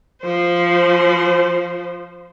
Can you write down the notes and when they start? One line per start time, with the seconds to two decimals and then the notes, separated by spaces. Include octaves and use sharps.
0.23 F3 C5